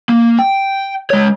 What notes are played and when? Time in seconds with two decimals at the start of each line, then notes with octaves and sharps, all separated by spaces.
0.09 A#3
0.39 G5
1.11 G#3 C#5